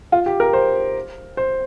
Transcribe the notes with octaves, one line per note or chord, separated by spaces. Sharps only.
F4
G4
A#4
C5
C5